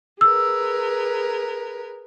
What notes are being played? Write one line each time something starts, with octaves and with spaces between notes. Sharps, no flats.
G#4 A#4 B4 E6